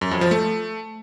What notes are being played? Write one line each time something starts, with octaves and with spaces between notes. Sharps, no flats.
F#2
F2
F3
A3